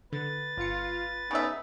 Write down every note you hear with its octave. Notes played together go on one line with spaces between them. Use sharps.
D3 B4 A6
G1 F4 C#7
C#3 B3 D#4 E5